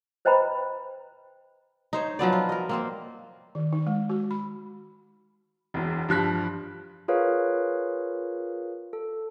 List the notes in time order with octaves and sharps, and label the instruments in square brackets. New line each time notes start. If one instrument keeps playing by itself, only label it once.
[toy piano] B4 C5 D#5 G5 A#5 B5
[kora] D#4 C5 C#5
F3 F#3 B3 D5
F4
A#4 D#5
A#3 C4 C5
[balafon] D#3
D#4
G#3
F#4
B5
[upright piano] E1 E2
G2 F3 F#6 B6
[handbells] F4 G#4 A#4 B4 C#5 F5
A4